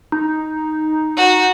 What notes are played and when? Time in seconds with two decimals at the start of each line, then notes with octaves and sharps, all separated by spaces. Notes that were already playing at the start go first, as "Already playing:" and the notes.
0.12 D#4
1.17 F#4